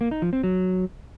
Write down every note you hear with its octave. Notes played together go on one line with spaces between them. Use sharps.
A#3
D#4
F3
C4
F#3